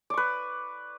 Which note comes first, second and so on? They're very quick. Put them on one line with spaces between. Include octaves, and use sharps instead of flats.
D5 C#6 B4